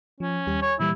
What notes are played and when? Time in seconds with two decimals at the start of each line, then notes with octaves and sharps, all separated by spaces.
0.20 F3 C#4
0.47 D#2 G3 G4
0.62 C#5 G#5 G#6
0.80 A#2 E3 G3 E4